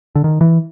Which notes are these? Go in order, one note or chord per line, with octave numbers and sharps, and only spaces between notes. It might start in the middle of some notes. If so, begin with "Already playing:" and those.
D3
D#3
E3